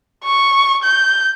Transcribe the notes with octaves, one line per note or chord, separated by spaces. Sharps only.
C#6
G6